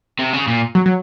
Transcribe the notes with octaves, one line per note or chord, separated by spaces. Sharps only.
C3
C#3
A#2
F#3
F#3